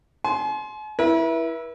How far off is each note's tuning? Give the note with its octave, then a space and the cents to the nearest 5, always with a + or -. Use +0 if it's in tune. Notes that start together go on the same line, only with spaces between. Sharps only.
G#5 +45 C6 +0
E4 +0 B4 -40